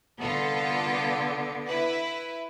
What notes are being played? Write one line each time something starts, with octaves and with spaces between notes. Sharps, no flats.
C2 D3 B3 F4 A4
E4 B4